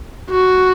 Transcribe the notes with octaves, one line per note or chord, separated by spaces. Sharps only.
F#4